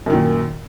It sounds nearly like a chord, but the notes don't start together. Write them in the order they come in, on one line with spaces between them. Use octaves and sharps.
F#2 D#3 A#2